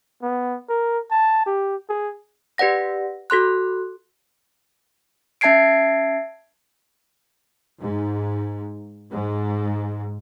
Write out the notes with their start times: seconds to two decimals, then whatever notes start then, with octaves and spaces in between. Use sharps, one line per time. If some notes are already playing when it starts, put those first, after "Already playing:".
0.22 B3
0.69 A#4
1.11 A5
1.46 G4
1.89 G#4
2.58 G4 B4 D5 F#5 A#6
3.30 F#4 A4 C6 F#6
5.41 C#4 E5 A5 G#6 C7 D7
7.80 G#2
9.12 G#2